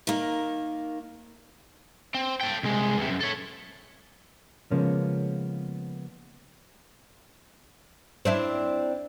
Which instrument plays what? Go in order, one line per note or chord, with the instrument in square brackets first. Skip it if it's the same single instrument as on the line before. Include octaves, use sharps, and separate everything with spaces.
[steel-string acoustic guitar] D#3 A#3
[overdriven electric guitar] C4
A4 G5
C2 G#3
E2 C3
F#2
A4 C#5
[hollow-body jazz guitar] C#3 F3 G#3 A#3 B3 C#4
[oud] C4 D4 E4